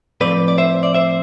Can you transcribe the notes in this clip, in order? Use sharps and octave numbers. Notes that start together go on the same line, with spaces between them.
A2 F3 C4 B4 D5
D5
C5 E5
D5
C5 E5